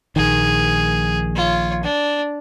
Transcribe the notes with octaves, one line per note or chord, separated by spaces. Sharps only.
A#1 D#3 G#4
F4 C#5
D4